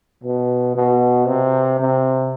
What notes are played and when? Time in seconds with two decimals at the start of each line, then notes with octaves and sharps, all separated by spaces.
0.24 B2
0.76 B2
1.27 C3
1.80 C3